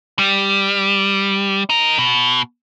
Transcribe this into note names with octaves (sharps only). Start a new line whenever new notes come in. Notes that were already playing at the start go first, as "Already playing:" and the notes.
G3
D#4 A#4
B2